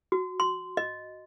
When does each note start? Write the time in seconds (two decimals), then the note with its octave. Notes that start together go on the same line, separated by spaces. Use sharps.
0.12 F#4
0.40 C6
0.77 D#5